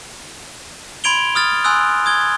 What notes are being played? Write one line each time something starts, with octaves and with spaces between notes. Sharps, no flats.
B5 C6 G#6 D7 F7 G7
D#6 F6 A6
G#5 C6 D#6 E6 F#6
D#6 G#6 G7